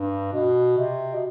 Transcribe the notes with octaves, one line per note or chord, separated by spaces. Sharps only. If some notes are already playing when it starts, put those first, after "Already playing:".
Already playing: G2
B2
C3
B2